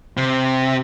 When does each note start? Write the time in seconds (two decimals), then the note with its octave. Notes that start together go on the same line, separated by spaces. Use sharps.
0.17 C3